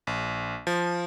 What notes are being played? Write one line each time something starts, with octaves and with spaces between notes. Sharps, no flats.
A#1
F3